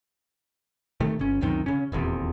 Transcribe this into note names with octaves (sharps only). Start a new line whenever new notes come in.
C3 D#3 A3
G1 C#4
C#2 F#2 C3 D#3
C#3 C#4
D#1 A#1 E2 C3